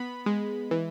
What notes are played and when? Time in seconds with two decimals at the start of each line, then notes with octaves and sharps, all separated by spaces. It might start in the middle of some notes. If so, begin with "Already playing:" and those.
Already playing: B3 B5
0.26 G#3
0.71 E3